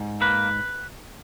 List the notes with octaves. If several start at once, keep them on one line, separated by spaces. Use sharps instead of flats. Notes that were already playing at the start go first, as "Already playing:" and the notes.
Already playing: G#2
A#3 B4